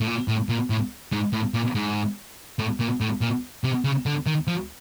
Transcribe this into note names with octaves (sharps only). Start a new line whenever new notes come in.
A2
A#2
A2
A#2
A2
G#2
A2
A#2
G#2
A2
A#2
A2
A#2
C3
C#3
D3
D#3
F3